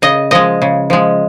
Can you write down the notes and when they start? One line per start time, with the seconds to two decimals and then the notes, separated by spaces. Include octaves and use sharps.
0.02 C#3 D#5
0.31 F3 G#3 D#5
0.62 C#3
0.90 F3 G#3